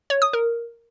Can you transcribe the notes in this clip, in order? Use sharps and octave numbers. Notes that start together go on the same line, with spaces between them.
C#5
D#6
A#4